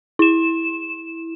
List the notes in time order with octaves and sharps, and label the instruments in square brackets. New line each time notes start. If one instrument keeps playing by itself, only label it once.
[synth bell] E4 E7